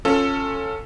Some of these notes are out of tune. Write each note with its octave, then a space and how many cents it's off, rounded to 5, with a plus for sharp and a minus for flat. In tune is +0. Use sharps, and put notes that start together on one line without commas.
C#4 -5 F4 +20 A4 +10